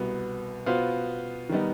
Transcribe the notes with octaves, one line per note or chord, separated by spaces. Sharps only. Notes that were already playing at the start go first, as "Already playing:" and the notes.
Already playing: C2 B2 B3
B2 B3 F4 C5 F5
D#3 G3 B3 D#4